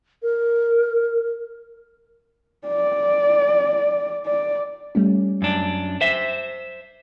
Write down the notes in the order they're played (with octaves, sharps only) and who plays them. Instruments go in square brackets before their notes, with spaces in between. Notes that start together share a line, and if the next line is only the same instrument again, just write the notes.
[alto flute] A#4
[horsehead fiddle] D5
D5
[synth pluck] G3 A3 C#4
[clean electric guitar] F#2 D4
C5 E5